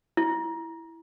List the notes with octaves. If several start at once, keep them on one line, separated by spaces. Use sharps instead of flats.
E4